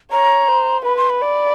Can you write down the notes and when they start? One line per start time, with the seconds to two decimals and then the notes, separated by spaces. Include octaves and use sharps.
0.11 C#5 A#5
0.48 C5
0.85 B4 B5
0.97 C6
1.10 B5
1.22 D5